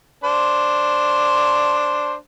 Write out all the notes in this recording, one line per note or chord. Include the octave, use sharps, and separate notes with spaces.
D4 C5